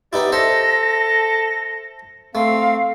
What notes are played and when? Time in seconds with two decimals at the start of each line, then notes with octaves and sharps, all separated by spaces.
0.13 B3 D#4 E4 G4 D5
0.32 A4 C5 E5 A#6
2.35 A3 C4 F5